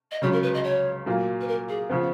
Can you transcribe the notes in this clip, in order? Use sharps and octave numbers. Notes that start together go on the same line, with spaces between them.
D#5
C#2 C#3 F#3 C#4 C#5
A#4
B4
D#5
C#5
A#2 F#3 A#3
B4
A#4
G#4
C#3 F3 B3